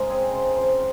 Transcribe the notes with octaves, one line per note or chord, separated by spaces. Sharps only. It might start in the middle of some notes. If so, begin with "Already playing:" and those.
Already playing: C#3 G#3 A#4 C5 D#5
C4 G#4
C#3 C5
F3 C5